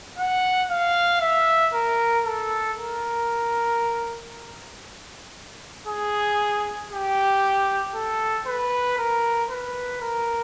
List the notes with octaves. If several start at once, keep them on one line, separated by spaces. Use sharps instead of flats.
F#5
F5
E5
A#4
A4
A#4
G#4
G4
A4
B4
A#4
B4
A#4